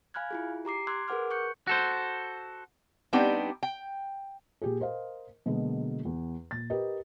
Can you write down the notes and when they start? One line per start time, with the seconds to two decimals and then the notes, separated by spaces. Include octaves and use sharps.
0.14 F5 G#5 B5 F6 F#6 G#6
0.31 E4 F4 G#4
0.65 G4 A#5 D6 C7
0.87 C6 D6 E6 F#6 G#6
1.08 G#4 A#4 B4 F#5 D6 F6
1.31 C#6 F#6 G6 C#7
1.67 F#4 A4 C5
3.13 G3 B3 C4 D4 D#4 G4
3.63 G5
4.62 A#2 G4 G#4
4.80 A#4 C5 D#5 F5
5.46 B2 D3 F#3 G#3 A#3
6.05 E2
6.51 A#2 A6
6.70 G4 A#4 B4 D#5